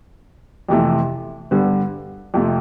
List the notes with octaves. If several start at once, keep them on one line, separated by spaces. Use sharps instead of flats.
F2 C3 E3 A3
G2 D3 G3 B3
F2 C3 F3 A3